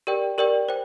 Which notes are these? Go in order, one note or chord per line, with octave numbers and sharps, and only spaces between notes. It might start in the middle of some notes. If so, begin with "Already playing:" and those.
G4 A#4 D5 G5
G4 A#4 D5 G5
C5 G5